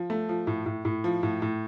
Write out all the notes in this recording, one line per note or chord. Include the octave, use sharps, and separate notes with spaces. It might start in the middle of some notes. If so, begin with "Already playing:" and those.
Already playing: F3
A3
F3
A2
A2
A2
F3
A2
A2